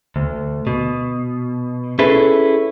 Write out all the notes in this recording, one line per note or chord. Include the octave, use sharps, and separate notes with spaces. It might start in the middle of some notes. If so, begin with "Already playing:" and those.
D2
B2
C#4 E4 G#4 A4 B4